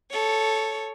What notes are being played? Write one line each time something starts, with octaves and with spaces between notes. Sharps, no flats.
A4 C#5